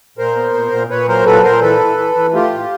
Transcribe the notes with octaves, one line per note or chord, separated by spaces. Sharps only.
A#2 A#4 C5
B3
A#2
A#2
A#2 B4 C#5
F#3 A#4 C5
A#2 A4 B4
A#2 A#4 C5
E3 A4 B4
E3
E3
E3
A3 F4 G4
A2